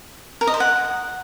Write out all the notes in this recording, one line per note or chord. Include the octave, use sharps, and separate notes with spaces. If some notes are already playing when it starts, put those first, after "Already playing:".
A#4
D#5
C5
F#5